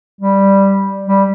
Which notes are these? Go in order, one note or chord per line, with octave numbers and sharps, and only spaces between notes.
G3
G3